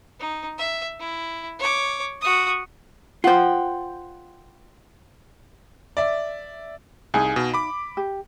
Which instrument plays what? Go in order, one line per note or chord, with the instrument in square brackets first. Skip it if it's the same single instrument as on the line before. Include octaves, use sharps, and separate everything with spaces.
[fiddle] D#4
E5
E4
C#5 D6
F#4 D#6
[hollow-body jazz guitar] F4 C5 [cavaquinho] F#5 G5
[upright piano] D5 E5
[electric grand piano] C2 G#4 [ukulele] D#4 F5 G#5
[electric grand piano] B2
B5 D6
[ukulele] G4